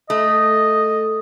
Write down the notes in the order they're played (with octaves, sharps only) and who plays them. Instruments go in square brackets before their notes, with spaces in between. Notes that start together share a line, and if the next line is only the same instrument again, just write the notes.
[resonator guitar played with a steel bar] A3 [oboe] D#5